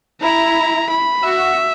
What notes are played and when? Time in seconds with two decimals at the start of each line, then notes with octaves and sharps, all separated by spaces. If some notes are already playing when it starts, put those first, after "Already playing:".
0.22 E4 A#5
0.90 B5
1.23 F#4 E5